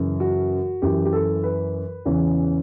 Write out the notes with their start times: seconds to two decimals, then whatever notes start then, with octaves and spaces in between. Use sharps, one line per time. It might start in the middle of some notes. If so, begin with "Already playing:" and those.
Already playing: F#2 C#3 E3
0.20 F#4
0.82 F#2 E3 G4
1.05 G4
1.13 A4
1.43 B4
2.05 E2 C#3 E3 C#4